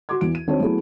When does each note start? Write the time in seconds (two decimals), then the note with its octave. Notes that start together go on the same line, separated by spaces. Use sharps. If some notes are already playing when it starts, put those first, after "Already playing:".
0.09 F#4 C6 D6 G#6
0.21 E2 E3 D7
0.35 D#7
0.47 D#3 C4 D4 F#4 C#5
0.59 F#3 A3 B3 E4 G#4